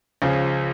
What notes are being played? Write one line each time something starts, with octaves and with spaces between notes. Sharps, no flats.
C#2 C#3 F3